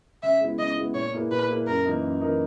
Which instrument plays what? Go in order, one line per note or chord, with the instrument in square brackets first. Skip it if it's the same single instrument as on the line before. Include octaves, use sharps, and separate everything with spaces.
[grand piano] C#3 [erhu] E5
[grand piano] G#3 B3 E4
[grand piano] C#3 [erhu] D#5
[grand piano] G#3 B3 E4
[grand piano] A#2 [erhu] C#5
[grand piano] A#3 E4 G#4 B4
[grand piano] A#2 [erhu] B4
[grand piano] A#3 E4 G#4 B4
[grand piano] F#2 [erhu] A#4
[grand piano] E3 A#3 D#4 A#4
F#2
E3 A#3 D#4 A#4